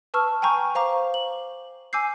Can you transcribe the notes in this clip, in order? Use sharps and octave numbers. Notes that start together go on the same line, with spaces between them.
B4 A5 C#6 E6 F6
G5 G#5 A#5 C#6 G6
C5 F5 A#5 C#6 D6
F#7
G#5 D6 E6 G6 C7